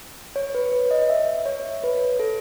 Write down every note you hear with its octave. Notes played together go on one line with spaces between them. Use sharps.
C#5
B4
B4
D#5
E5
C#5
B4
A4